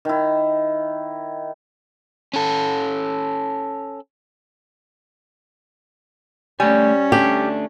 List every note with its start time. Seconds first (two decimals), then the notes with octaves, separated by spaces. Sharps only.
0.05 D#3 E4
2.34 C#4 A4
6.60 G3 A3 C#4 D5 G#5
7.12 A3 D4 G4